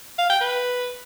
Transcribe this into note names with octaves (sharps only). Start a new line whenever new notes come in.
F5
G5
B4